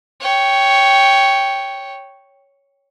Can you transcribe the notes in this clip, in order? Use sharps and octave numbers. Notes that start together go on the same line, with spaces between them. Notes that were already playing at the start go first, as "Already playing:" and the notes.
C#5 G5